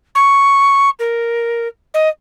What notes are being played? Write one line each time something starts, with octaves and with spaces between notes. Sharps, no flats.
C#6
A#4
D#5